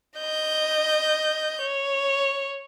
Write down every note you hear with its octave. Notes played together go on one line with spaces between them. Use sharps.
D#5 G6
C#5